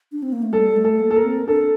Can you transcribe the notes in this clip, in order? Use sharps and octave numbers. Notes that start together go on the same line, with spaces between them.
D4
C4
A#3
A3
G3 A4
A3
A4
A#3
A4
A#4
C4
D4 A4